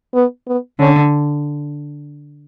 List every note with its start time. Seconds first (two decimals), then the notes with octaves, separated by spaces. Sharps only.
0.15 B3
0.48 B3
0.79 D3 C#4